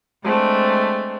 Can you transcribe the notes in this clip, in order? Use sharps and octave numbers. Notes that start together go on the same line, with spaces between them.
G#3 A3 C4 D4